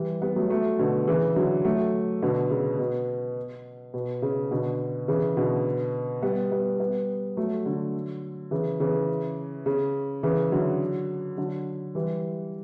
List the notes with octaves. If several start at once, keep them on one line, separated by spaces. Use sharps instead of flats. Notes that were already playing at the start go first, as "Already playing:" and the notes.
Already playing: E3 G3
G3 B3
F#3 A3
F#3 A3
B2 D3
C#3 E3
D3 F#3
F#3 A3
B2 D3
C#3
B2
B2
C#3
B2 D3
C#3 E3
B2 D3
G3 B3
G3 B3
G3 B3
F#3 A3
D3 F#3
C#3 E3
C#3 E3
C#3
C#3 E3
D3 F#3
D3 F#3
E3 G3